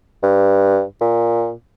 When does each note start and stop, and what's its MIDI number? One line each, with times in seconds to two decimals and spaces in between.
0.23 0.83 43
1.01 1.52 46